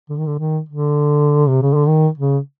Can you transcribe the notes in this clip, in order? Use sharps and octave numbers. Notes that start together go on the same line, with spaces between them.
D3
D#3
D3
D#3
D3
C3
C#3
D3
D#3
C#3